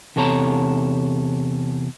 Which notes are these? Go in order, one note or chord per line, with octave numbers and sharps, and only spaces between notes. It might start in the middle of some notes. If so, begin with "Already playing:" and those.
E2 C3 A4 C#5 A5 A#5